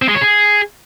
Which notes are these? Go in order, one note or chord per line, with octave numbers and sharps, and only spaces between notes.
C4
G#3
C#5
G#4